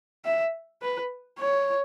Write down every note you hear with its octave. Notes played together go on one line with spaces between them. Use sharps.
E5
B4
C#5